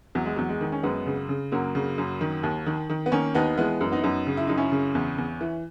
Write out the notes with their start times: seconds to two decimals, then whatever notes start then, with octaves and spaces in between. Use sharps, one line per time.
0.15 E2 F#3
0.26 G#3
0.36 E2 F#3
0.49 G#3
0.61 D#3
0.72 C#4
0.83 F#2 G#3 B3
1.07 C#3
1.29 C#3
1.52 F#2 F#3 A#3
1.75 C#3
1.98 F#2
2.21 D#3
2.43 D#2
2.66 D#3
2.90 D#3
3.06 B3
3.12 D#3 A#3 C#4
3.34 D#2 B3 D#4
3.58 E3 G#3 B3
3.81 F#2
3.92 B3 D#4
4.04 F#2
4.27 C#3
4.37 E4
4.47 F#2 D#4
4.57 C#4 E4
4.72 C#3
4.95 E2
5.18 E2
5.41 E3